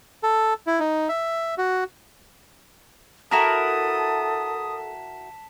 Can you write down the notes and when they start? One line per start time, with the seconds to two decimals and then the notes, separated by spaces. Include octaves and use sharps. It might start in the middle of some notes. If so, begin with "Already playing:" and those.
0.23 A4
0.67 E4
0.80 D#4
1.09 E5
1.58 F#4
3.31 E4 F#4 A4 A#4 A5 D#6 B6 E7